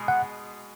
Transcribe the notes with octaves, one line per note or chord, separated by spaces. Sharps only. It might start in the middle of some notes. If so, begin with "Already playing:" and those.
Already playing: B2 G#3
F#5